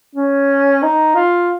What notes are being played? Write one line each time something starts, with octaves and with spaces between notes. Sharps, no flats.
C#4
D#4
F4